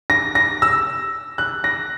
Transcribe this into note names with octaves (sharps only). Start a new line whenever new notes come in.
A#6
A#6
E6
F#6
A#6